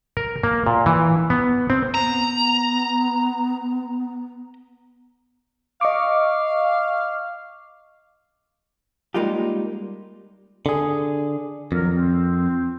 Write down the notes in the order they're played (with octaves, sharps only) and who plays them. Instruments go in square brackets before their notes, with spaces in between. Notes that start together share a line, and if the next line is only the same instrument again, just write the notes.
[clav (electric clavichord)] A#4
A#3
A#2
E3
B3
C4
[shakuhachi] B3 [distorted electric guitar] A#5
[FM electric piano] D#5 C#6 D6 [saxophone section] F5
[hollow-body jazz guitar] G3 G#3 A#3 D#4 F4 G4
[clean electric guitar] D3 G#4
[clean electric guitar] F2 [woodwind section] D#3 F#3 A#4
[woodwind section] C4